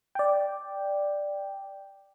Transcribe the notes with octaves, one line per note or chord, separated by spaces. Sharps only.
D5 G5